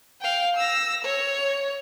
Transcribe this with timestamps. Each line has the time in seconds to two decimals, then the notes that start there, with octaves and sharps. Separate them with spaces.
0.21 F5 G5
0.56 E6 A#6
1.04 C#5